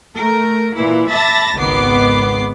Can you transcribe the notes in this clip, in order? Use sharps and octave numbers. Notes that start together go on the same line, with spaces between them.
A3 A#4
A#2 E3 E4
E5 A5 B5 D6 A6 A#6
G#1 C#2 D#3 B3 D6 C7